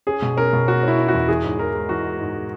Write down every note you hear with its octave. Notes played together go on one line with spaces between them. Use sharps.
C#4 G#4
B2
C#4 A#4
B2
C#4 F#4
C#4 E4
C#4
F#4
E2
E3 G#4
G#2
E3 A#4
G#3
E3 F#4
G#3
G#2
G#3